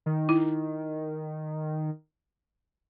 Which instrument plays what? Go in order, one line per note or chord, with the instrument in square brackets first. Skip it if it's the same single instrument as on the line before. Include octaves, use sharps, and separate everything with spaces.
[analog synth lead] D#3
[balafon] E4